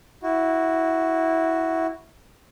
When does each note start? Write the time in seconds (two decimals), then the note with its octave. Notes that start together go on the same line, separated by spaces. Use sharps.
0.23 E4 F#4